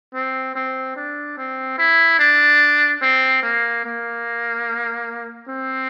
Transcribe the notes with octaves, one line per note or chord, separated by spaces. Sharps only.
C4
C4
D4
C4
E4
D4
C4
A#3
A#3
C4